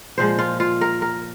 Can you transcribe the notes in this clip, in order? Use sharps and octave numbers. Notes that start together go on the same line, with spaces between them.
A#2 F3 G#3 C5
F4
F4
A#4
A#4